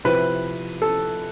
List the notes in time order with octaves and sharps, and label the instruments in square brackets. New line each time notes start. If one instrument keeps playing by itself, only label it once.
[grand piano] C3 F3 C4 E4 [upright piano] B4
[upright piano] A4